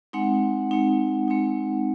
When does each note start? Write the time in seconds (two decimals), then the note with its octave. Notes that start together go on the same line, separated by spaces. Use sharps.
0.13 G#3 C4 D#4 F#5
0.71 G#3 C4 D#4
1.28 G#3 C4 D#4